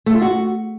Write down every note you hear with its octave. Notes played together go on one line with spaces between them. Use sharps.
A3
F4
F#4